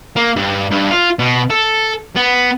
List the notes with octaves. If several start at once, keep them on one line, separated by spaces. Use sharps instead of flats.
A#3
G2
G2
F4
B2
A4
B3